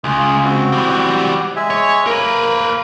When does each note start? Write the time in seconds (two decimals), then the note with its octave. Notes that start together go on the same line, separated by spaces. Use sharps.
0.04 C#2 F4 G#4
0.44 C4 F#4
0.72 E3 G3
1.56 G#3 E5 G#5
1.70 C#5
2.07 A#3 A#4 B4